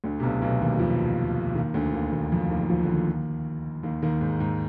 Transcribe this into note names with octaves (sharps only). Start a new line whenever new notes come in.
D2 D3
C3
B1 B2
B1 B2
D#2 D#3
F2 F3
D#2 D#3
D2 D3
D#2 D#3
D#2 D#3
F2 F3
D#2 D#3
D#3
F2 F3
D3
D#2 D#3
D#2 D#3
D#2 D#3
G#2
G#2